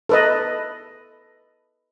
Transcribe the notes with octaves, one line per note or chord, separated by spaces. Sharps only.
A4 B4 D#5